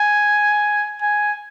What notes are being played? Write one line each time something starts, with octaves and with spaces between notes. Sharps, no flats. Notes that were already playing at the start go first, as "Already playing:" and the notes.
Already playing: G#5
G#5